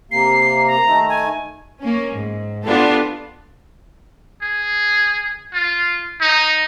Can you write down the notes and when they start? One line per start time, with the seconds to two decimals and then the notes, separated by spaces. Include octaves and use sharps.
0.11 C3 A#3 C7
0.67 A#5
0.86 D#3 A3
1.09 G#5
1.81 A#3 C#4
2.16 G#2
2.64 B3 D4 F4 G4 A4
4.42 G#4
5.53 F4
6.21 D#4